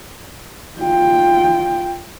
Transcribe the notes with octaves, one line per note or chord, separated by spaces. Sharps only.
F4 G5